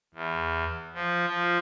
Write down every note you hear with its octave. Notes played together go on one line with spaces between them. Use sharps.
E2
F3
F3